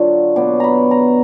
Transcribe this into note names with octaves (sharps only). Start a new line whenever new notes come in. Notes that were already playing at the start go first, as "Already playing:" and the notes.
Already playing: D3 F#3 D4 F4
B2 F#3 B3 D6
A#5 B5
A#5